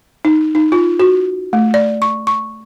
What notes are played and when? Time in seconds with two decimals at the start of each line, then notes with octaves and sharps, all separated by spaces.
0.25 D#4
0.55 D#4
0.72 F4
1.00 F#4
1.53 A3
1.74 D5
2.02 C#6
2.27 C#6